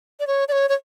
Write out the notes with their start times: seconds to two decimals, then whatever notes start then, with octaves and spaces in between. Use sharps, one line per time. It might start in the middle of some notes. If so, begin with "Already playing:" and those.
0.20 D5
0.27 C#5
0.48 D5
0.52 C#5
0.69 C#5